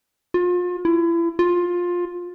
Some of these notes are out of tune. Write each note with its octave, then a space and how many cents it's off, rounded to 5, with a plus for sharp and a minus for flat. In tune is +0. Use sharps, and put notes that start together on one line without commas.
F4 +35
E4 +35
F4 +15